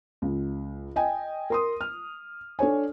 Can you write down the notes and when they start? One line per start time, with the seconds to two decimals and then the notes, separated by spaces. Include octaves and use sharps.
0.22 C#2
0.96 D#5 G5 G#5
1.50 A#4 C6 D#6
1.81 F6
2.59 D4 A4 C#5 G#5